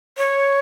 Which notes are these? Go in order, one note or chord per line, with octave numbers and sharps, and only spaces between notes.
C#5